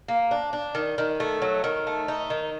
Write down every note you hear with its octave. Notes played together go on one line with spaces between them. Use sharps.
A#3
D4
D4
D#3
D#3
A3
F#3
D#3
A3
D#4
D#3